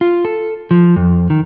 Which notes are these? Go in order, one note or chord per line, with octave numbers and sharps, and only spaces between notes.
F4
A4
F3
F2
D#3